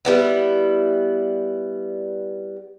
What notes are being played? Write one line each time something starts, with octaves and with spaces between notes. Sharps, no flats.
G3 B3 E4